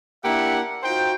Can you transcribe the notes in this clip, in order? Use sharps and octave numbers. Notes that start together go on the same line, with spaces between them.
A#3 D4 E4 G4 E5 F#5
D#4 F4 F#4 C5 G5